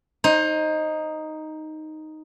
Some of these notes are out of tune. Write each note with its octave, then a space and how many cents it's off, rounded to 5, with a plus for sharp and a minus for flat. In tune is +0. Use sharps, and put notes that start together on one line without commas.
D#4 +0 C5 +25